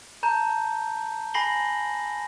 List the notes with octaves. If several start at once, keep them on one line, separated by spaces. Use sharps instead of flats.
A5 A#5 G6
G#5 B5 A#6 C7 F#7 G7